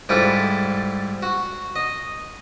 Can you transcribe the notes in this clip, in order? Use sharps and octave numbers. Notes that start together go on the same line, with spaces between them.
G#2 G3 E4 F4 A4
F#4
D#5